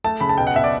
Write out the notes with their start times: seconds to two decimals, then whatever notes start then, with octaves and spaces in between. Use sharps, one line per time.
0.04 A3 A5
0.21 C#3 B5
0.29 A5
0.38 B2 G5
0.47 F#5
0.56 B2 E5
0.64 D5